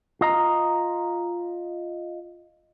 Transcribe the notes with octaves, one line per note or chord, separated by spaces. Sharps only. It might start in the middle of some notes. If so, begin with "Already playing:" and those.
F4 D#5 A#5